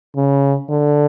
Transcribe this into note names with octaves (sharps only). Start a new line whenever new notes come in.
C#3
D3